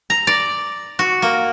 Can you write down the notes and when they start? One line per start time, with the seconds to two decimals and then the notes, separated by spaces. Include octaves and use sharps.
0.10 A#5
0.27 D5
0.99 F#4
1.22 A#3